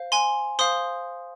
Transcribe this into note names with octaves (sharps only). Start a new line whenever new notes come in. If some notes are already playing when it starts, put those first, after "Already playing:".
Already playing: C5 F5
G#5 C6
C5 F5 C6 D#6